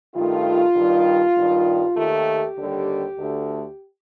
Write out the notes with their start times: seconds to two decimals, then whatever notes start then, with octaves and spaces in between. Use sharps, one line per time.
0.15 G2 D#3 A3 F4
0.76 G2 D#3 G3
1.36 G2 D#3 G3
1.96 D#2 D#3 A3 G4
2.56 D#2 D3 G3
3.16 D2 D3 A3